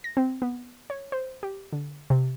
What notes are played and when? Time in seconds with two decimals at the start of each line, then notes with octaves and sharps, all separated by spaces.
0.04 A#6
0.17 C4
0.42 B3
0.90 C#5
1.12 C5
1.43 G4
1.73 D3
2.10 C3